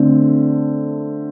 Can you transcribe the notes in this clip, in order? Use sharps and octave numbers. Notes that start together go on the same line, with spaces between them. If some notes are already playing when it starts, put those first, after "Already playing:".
Already playing: D3 A3 C4